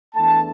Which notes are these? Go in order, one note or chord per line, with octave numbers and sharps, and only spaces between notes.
E2 E3 A3 D4 A5